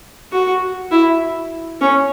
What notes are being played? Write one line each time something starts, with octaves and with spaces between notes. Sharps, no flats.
F#4
E4
C#4